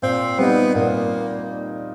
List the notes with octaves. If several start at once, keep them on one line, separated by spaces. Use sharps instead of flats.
A#2 C4
G3 B3 C4 D#4
A#2 A#3